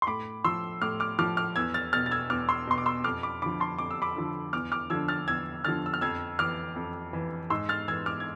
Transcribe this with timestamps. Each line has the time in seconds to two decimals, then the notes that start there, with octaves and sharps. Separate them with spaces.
0.02 C6
0.07 A2 B5 D6
0.44 F3 C6 E6
0.82 A2 D6 F6
1.00 D6 F6
1.19 F3 D6 F6
1.37 D6 F6
1.56 E2 E6 G#6
1.74 F6 A6
1.93 B2 F6 A6
2.06 A6
2.11 E6 G#6
2.30 E2 D6 F6
2.49 C6 E6
2.67 B2 C6
2.78 D6
2.86 C6 E6
3.04 F2 D6 F6
3.23 B5 D6
3.42 D3 F3 B5 D6
3.60 A5 C6
3.79 F2 D6
3.91 E6
4.02 B5 D6
4.16 D3 F3
4.53 E2 D6 F6
4.72 D6 F6
4.90 D3 F3 E6 G#6
5.08 F6 A6
5.27 E2 E6 G#6
5.65 D3 F3 F6 A6
5.86 E6
5.94 F6
6.01 F2 E6 G#6
6.39 E3 D6 F6
6.76 F2
7.13 E3
7.50 G#2 C6 E6
7.69 F6 A6
7.88 E3 E6 G#6
8.06 D6 F6
8.20 G#6